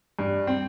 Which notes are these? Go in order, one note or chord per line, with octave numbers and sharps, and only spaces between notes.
G2
C4